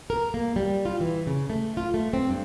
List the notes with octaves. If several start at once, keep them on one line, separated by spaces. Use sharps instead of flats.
A#4
A#3
G3
F4
E3
C#3
A3
F4
A3
C4
G2